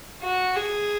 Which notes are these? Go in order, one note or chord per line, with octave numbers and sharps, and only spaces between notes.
F#4
G#4